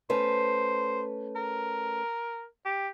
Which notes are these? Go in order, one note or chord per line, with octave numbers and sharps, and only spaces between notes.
A3 C#4 B4 C5
A#4
G4